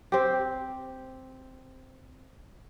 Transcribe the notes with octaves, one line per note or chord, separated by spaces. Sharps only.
C4 G4